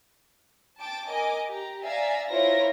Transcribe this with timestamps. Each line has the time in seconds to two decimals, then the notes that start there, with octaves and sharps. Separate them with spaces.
0.79 G5 A5 D6
1.09 A#4 D#5 G#5 D6
1.46 G4 A#5
1.83 D5 E5 F5 G#5 A#5
2.29 E4 F4 A#4 C5 C#5 A#6